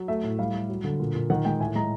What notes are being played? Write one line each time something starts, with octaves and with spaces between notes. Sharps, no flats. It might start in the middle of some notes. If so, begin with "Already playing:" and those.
Already playing: F#3
A3 E5
A2
G3 F5
G3
F#3
D3
A#2
A#2
D#3 F#5
G#3 G5
A2 G#5
G#3 A#5